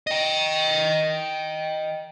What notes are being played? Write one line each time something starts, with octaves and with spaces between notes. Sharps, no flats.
D#5 G5